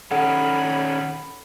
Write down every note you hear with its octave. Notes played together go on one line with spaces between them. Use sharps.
D#3 C#4 A4 F#5 B5